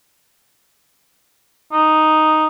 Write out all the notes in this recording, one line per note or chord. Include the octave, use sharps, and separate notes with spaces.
D#4